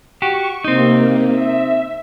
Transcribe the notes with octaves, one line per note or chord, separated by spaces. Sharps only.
F#4 G4 C#6
C3 A#3 C4 D#4
E5